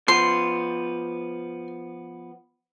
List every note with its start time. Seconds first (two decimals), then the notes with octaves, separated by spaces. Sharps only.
0.08 F3 B3 C6